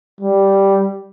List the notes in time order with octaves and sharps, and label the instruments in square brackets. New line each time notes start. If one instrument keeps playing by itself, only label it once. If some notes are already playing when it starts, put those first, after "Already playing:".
[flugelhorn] G3